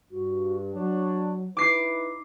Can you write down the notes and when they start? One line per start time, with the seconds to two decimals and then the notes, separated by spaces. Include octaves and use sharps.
0.11 G2 F#4
0.74 F#3 D4 C#5
1.57 D#4 E4 B4 D6 C7